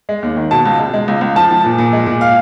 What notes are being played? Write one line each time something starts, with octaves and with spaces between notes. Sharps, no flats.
G#3
D#2
D#3
B2 A5
C#2
G#3
G#3
C#2
C#2
F3 A5
F3
A#2
A#2
G#3
A#2
F5